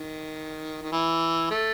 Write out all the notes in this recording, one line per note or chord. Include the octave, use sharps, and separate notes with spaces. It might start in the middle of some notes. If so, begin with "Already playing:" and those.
Already playing: D#3
D#3
E3
A3